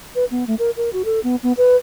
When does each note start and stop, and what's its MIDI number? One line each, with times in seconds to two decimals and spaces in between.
0.15 0.25 71
0.31 0.44 59
0.47 0.55 57
0.59 0.70 70
0.77 0.92 70
0.93 1.03 66
1.05 1.20 69
1.24 1.36 59
1.43 1.53 59
1.57 1.76 71